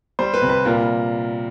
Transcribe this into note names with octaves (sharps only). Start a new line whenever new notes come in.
G3 C5
B4
C3
B4
A#2 A#4